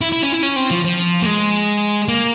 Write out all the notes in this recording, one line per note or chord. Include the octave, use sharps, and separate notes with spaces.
E4
E4
C#4
E4
C#4
C4
F3
F3
A#3
G#3
A#3